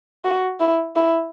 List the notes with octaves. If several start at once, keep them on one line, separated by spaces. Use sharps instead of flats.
F#4
E4
E4